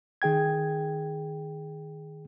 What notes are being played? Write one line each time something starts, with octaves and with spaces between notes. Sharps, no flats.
D#3 G#4 G5 G#6